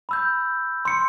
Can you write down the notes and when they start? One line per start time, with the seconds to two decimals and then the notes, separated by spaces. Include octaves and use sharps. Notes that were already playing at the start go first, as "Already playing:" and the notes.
0.09 B5 E6 G6
0.85 C6 C#7